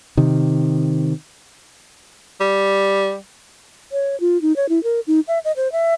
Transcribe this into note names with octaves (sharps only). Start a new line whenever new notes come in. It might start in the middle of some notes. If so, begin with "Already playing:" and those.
C3 D#3
G3
C#5
F4
D#4
C#5
E4
A#4
D#4
E5
D#5
C5
E5